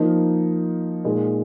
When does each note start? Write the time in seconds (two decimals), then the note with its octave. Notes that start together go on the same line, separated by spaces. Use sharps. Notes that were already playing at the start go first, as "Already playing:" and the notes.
Already playing: F3 A#3 D#4
1.04 A#2 G#3 D#4